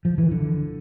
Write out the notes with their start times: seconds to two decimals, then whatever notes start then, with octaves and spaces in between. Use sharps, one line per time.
0.05 F3
0.18 E3
0.31 D3